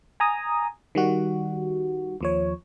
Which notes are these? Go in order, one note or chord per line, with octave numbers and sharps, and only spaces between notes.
G#5 A#5 D#6
D#3 G3 F#4
D#2 F3 C#5